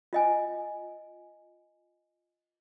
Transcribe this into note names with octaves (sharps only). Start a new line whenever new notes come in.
F4 D#5 G#5